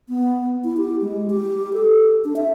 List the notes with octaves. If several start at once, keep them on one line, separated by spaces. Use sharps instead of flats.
B3
E4
G4
G#3
G4
A4
D4
E5